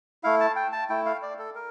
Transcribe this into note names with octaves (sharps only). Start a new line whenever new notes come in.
A3 E4 F5
A5
G5
A5
A3 E4 G5
F5
D5
A4
A#4